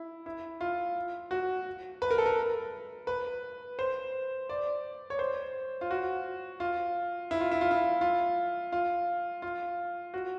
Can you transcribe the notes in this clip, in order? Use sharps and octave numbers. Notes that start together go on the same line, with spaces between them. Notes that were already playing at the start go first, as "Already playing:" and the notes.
Already playing: E4
E4
F4
F#4
B4
A#4
A4
A#4
B4
C5
D5
C#5
C5
F4
F#4
F4
E4
F4
E4
F4
E4
F4
F4
F4
F#4